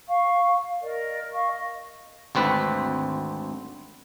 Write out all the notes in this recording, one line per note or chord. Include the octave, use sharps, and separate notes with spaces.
F5 C#6
A#4 D5 D#5
D#5 F5 C#6
D#5
G#1 D2 C4 B4